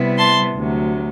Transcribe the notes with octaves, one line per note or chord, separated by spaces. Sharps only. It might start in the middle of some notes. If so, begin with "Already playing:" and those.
Already playing: C3 G3 B3 E4
A5 C6
D2 C3 F#3